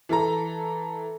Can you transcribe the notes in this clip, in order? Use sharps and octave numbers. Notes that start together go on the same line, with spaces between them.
E3 A4 A#5